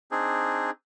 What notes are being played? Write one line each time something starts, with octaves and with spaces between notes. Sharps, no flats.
C4 D4 D#4 G#4